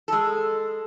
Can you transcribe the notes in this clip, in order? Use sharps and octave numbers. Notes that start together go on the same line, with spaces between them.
G#3 A4